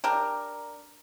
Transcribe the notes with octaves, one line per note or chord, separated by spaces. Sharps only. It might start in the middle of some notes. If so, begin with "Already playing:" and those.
D4 G4 A#4